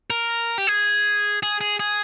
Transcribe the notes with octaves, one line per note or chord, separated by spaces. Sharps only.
A#4
G4
G#4
G#4
G#4
G#4